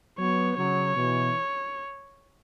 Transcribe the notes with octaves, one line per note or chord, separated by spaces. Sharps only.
F#3 B3 C#5
C#3 F#3 C#5
B2 E3